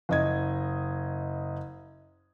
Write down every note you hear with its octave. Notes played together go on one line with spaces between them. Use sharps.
F#1 D#5 G#6